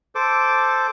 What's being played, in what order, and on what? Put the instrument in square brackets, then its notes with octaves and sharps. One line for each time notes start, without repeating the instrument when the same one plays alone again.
[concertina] A4 C5 D6